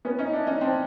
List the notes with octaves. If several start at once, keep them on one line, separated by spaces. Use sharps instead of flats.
B3 C#4
C#4 D#4
D4 E4
C#4 D#4
C4 D4